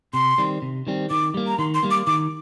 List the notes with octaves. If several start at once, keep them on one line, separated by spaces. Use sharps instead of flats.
C3 C6
D#3 G3 C4
C3
D#3 G3 C4
D#3 D6
G3 A#3
A#5
D#3 C6
C6
G3 A#3
D6
D#3 D6